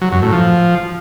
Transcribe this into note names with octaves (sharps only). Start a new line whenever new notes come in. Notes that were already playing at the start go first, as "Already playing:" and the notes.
F#3
F#2
A2
F3